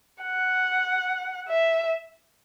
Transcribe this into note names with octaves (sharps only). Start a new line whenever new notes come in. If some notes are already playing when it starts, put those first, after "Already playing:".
F#5
E5